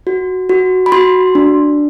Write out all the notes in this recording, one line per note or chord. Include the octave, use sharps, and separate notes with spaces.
F#4
F#4
B5
F#4 C6
D4